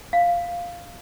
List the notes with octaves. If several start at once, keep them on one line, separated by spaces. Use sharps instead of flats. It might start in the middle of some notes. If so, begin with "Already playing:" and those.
F5